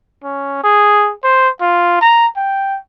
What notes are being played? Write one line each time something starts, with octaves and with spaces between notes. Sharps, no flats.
C#4
G#4
C5
F4
A#5
G5